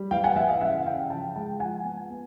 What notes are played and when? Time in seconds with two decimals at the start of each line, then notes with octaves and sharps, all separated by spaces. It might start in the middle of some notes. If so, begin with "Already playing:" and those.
Already playing: G3
0.11 E3 F5 G5
0.24 F#5 G#5
0.36 E3 E5 F#5
0.48 D#5 F5
0.61 C#3 E5 F#5
0.85 C#3 F5 G5
1.10 F3 G5 A5
1.35 G#3 G5 A5
1.60 F3 F#5 G#5
1.84 B3
2.10 B3